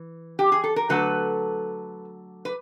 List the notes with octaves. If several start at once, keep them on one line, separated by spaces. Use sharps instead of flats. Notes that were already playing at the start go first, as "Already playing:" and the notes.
Already playing: E3
G4
G#4
A4
A#4
D3 F#3 A3 A4 B4
B4